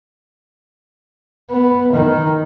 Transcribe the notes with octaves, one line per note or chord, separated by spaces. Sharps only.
B3
D#3